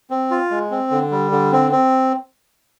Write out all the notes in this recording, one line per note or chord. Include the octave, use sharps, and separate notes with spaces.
C4
F4
G#3
C4
D3
G3
D3
C4
C4